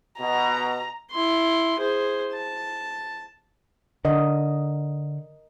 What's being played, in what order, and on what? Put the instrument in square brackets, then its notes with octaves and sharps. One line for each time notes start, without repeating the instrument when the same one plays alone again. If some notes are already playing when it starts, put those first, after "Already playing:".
[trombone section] B2 [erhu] A#5
[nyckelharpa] E4 C6
G#4 C5
A5
[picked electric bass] D3 [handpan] A#4 D#5